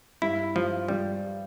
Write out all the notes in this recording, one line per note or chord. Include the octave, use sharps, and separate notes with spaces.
G2 E4
G2 F3
G2 G3